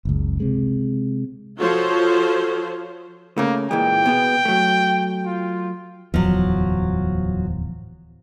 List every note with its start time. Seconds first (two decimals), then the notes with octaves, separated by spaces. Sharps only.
0.05 F#1 C#2
0.40 C3 G#3
1.59 F3 F4 F#4 A4 C5 C#5
3.38 C#3 A3 A#3
3.71 A#2 E3 G#3 G5
4.06 B2 B3 G#4
4.45 F#3 A3
5.26 F4
6.14 D1 E2 F3 F#3